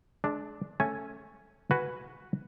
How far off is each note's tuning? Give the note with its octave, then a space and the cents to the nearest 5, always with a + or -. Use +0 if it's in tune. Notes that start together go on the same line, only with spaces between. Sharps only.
G#3 +40 D4 +0
A3 +0 C#4 +0 G#5 +0
F#4 +0 B4 +0 G#5 +0